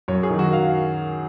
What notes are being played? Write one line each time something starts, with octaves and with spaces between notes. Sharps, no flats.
F#2 C#5
G#4
D#3 F#3
F#4
F5